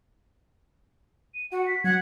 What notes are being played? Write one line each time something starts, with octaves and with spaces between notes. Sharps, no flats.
D#7
F#4 F#5
B6
F#3 F#5 G#6